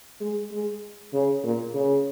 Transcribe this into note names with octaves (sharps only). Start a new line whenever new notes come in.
G#3
G#3
C#3
A#2
C#3